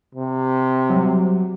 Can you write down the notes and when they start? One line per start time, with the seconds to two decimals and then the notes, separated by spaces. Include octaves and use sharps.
0.15 C3
0.90 F#3 G3